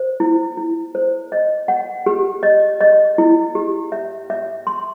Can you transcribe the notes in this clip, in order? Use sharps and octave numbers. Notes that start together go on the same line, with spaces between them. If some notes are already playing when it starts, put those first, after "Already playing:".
Already playing: C5
E4
E4
C5
D#5
F#5
G4
D#5
D#5
E4
G4
E5
E5
C6